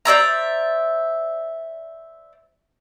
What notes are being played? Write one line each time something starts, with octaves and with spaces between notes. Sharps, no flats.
C5 D5 E5 A#5